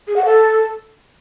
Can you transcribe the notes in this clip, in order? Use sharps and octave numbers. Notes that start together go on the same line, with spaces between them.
G#4
F#5
A4